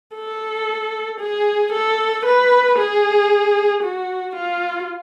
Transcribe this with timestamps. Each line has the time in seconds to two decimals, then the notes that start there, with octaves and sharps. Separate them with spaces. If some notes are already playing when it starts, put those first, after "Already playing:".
0.15 A4
1.20 G#4
1.72 A4
2.25 B4
2.78 G#4
3.83 F#4
4.35 F4